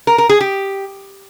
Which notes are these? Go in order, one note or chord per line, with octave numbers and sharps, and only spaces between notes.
A#4
A#4
G#4
G4